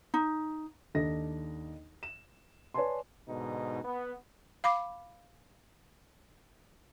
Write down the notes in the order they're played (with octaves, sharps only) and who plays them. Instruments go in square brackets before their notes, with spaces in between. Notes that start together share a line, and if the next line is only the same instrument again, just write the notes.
[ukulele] D#4
[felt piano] D#2 D4 D#4 A4 D#5 A#6
E7
B4 C#5 D5 G#5 A5 C6
[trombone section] G#2 B2 D3 D#4
B3
[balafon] F5 B5 D6